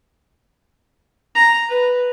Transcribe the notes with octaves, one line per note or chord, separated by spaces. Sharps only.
A#5
B4